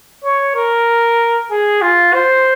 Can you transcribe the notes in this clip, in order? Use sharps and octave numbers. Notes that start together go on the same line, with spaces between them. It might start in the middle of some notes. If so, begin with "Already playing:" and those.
C#5
A#4
G#4
F4
C5